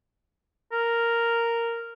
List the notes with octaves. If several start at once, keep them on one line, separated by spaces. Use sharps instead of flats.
A#4